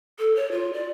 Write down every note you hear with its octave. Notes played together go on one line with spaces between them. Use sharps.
A4
C#5
F4
D5